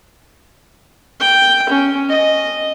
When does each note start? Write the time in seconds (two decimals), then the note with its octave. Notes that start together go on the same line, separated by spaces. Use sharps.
1.20 G5
1.69 C#4
2.09 D#5